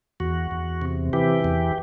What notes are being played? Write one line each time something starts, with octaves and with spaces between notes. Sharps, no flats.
E2 F#4
E2
C3
E3 G4
E2